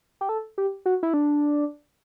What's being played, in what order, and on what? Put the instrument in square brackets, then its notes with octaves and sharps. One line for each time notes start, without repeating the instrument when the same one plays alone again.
[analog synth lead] G4
A4
G4
F#4
E4
D4